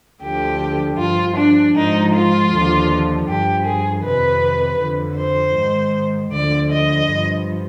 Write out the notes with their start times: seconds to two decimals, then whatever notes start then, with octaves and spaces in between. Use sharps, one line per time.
0.22 D2 D3 F3 G4
0.98 G2 F3 F4
1.36 D4
1.74 G#2 F3 D#4
2.12 F4
2.51 D#2 D3 F3
3.26 G2 F3 G4
3.64 G#4
4.02 F2 C3 D#3 B4
4.79 F2 D3 F3
5.17 C5
5.55 G#2 D#3
6.32 D2 D3 F3 D5
6.70 D#5
7.07 G2 F3